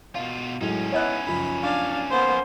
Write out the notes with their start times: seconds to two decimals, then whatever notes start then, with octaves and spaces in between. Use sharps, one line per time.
0.15 B2 F4 F5
0.61 A2 F#3 G#3 C#4 D#4
0.92 B3 E4 C#5 D#5 F#6
1.26 C#2 F#2 F3 B5
1.62 D4 F5
2.11 A#3 B3 C5